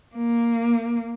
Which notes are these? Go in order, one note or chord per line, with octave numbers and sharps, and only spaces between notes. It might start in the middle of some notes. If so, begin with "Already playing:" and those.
A#3